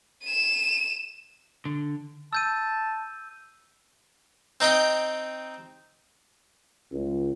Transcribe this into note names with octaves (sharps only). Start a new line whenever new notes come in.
D#7 E7
D3
A5 E6 G6 D#7
C4 D#4 D#5 G5
C#2